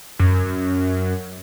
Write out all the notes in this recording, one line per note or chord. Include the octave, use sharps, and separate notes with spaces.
F#2